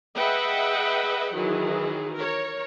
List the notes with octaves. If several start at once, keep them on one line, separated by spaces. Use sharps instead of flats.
G#4 B4 D#5 E5 F#5 G5
D#3 E3 F#3 G#4
A#4 C#5